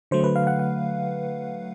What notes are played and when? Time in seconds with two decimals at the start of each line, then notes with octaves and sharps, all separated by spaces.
0.11 D3 F#3 A3 C5
0.24 B4
0.36 F5
0.47 F#5
0.59 F#5